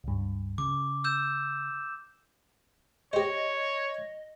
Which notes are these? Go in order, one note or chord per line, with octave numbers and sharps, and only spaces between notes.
C#2 G2
C#3 D6
E6 G6 E7
G4 C5 C#5 D#5